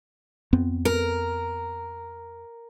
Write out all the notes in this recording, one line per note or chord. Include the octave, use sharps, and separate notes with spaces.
F2 B3 C4
A#4